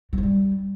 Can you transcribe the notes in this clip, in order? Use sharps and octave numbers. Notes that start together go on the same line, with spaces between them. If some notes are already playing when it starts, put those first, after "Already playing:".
F#3
F3
G3